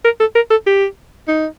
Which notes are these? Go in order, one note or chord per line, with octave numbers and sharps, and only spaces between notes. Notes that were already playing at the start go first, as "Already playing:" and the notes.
A#4
A4
A#4
A4
G4
D#4